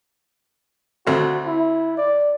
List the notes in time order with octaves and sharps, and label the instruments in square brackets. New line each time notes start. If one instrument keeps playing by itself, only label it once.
[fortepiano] D2 A3 C4 [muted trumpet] F#4
[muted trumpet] E4
D5